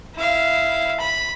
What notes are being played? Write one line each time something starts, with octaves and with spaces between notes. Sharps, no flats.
E4 F5
B5